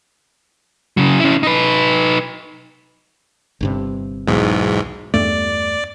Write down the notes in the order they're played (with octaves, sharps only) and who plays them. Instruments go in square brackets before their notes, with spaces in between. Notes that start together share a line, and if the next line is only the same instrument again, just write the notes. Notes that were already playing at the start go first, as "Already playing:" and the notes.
[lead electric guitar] C#3 F#3
C#4 E4
D#4 B4
[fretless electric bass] G1 G2 C3
[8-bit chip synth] B1 E2 G#2
[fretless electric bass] E2 G2 A3 [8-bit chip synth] D5